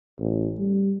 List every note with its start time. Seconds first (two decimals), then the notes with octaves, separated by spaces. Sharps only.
0.19 A1
0.59 G3